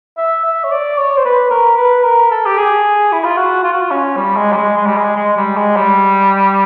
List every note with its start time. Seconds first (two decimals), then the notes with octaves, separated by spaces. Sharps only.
0.18 E5
0.45 E5
0.64 C#5
0.71 D5
0.98 C#5
1.17 C5
1.25 B4
1.51 A#4
1.77 B4
2.04 A#4
2.31 A4
2.46 G4
2.57 G#4
3.12 E4
3.24 F4
3.37 F#4
3.64 F4
3.72 F#4
3.82 F4
3.91 C#4
4.17 G3
4.37 G#3
4.52 G3
4.57 G#3
4.77 G#3
4.87 G3
4.97 G#3
5.16 G#3
5.37 G3
5.57 G#3
5.76 G3